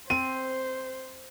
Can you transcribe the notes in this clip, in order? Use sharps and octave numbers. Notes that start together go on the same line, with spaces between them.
C4 C5 D#7